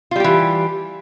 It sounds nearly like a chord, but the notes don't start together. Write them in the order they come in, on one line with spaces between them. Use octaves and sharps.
F4 G3 G4 E3